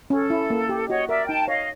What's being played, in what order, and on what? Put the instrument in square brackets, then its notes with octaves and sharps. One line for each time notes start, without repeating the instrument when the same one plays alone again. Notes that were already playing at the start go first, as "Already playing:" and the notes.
[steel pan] C#4 [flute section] A4
[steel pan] E4
A#3
G4
[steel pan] F#4 [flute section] C#5 D#5
[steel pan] A#4 [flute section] D5 E5
[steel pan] D#4 [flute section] G5 A5
[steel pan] C#5 [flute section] D#5 F5